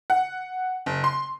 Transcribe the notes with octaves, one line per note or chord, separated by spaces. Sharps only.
F#5
F#1
C6